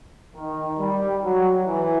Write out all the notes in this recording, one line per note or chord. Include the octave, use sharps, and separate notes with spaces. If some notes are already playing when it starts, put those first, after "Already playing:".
D#3
G3
F#3
E3